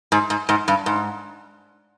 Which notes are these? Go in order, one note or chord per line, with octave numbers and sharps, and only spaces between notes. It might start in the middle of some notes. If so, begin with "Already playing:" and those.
G#2
G#2
G#2
G2
G#2